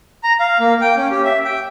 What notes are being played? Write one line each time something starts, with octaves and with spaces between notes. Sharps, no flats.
A#5
F5
A#3
G5
C#4
G4
E5
G5